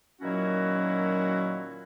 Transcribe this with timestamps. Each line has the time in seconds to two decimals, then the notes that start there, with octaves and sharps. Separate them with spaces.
0.21 A#2 D#3 F#3 C#4 E4 F#4